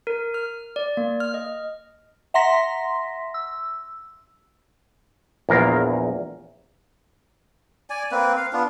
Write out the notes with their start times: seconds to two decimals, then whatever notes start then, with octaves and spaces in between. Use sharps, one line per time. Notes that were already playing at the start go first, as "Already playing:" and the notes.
0.07 A#4
0.34 F6
0.76 D5
0.97 A#3
1.20 F6
1.34 D#5
2.34 E5 F#5 A#5 C6 A#6 B6
3.34 E6
5.49 A#1 E2 A#4 F5
7.90 D5 G#5
8.12 A#3 C4 B4
8.37 F5
8.53 B3 D4 F4